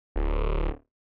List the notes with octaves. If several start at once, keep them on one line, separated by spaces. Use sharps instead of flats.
D1